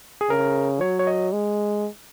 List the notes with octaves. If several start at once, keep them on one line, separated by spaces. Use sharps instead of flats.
G#4
C#3 A#4
F#3 C#5
C#5
D#5
G#3